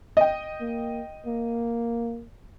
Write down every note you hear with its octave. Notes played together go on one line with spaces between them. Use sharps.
D#5 G5
A#3
A#3